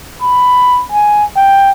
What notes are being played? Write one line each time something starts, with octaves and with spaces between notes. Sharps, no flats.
B5
G#5
G5